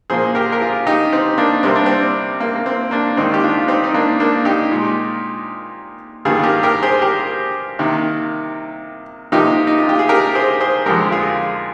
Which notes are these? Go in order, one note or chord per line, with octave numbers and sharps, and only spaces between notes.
A#2 F3 A#3 G#4 C5
G4 A#4
A#4
F4 G#4
D#4 G4
C4 D#4
A#3 D4
C3 G3 A#3 C4
D4
C4
A#3
A#3
C4
A#3 D4
G#2 D#3 A#3 C4 D#4
G4
D4 F4
C4 D#4
D#4
A#3 D4
A#3 D4
D#4 G4
A#2 G#3
G2 D#3 G3 A#3 F4 G#4
G4 A#4
G4 A#4
G#4 C5
G4 A#4
C3 D#3 A#3
C3 F3 A#3 D#4 G4
D#4
F4
G4
G#4
G4 A#4
G#4 C5
G#4 C5
F2 D3 G#3 G4 A#4
F4 G#4